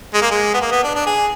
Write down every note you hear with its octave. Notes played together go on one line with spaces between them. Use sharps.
G#3
A#3
G#3
B3
A#3
B3
D4
D4
G#4